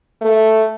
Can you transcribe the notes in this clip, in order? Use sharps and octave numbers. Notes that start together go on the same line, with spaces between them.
A3